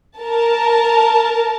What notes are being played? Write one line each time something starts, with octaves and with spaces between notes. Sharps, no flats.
A#4 A5